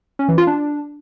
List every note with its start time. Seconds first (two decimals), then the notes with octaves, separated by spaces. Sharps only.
0.19 C#4
0.29 E3
0.38 F4
0.47 D4